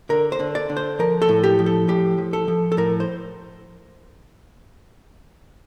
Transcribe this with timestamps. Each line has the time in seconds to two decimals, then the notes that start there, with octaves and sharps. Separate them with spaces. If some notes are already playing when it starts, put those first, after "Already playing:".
0.09 D3 A#4
0.32 C5
0.40 D3
0.55 D5
0.69 D3
0.77 C5
0.99 F3 A#4
1.22 A4
1.29 A2
1.43 G4
1.59 F3
1.66 A4
1.88 A2 G4
2.18 F3
2.33 A4
2.48 F3
2.72 A4
2.77 A2 A#4
3.00 C5